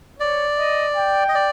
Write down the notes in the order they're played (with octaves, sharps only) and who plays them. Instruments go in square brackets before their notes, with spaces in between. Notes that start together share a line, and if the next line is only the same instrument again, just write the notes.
[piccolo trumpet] C#5 [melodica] D5
[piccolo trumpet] D#5
G5
[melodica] D#5
D5